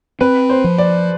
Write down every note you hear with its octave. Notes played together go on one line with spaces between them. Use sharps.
C4 B4
C5
F3
D5